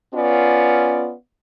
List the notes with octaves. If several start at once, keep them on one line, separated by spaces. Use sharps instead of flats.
B3 C#4 F4 D5